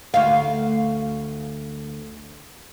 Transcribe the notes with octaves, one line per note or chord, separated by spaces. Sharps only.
D2 F5